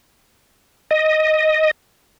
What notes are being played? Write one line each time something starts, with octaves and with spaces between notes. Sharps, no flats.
D#5